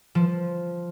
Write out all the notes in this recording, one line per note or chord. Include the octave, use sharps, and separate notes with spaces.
F3